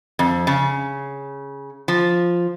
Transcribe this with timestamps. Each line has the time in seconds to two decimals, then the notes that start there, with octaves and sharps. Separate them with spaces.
0.19 F2
0.47 C#3
1.88 F3